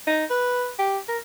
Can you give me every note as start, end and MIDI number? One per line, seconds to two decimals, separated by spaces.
0.07 0.25 63
0.30 0.69 71
0.78 0.97 67
1.08 1.17 70